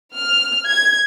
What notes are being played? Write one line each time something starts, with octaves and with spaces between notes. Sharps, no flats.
F6
G#6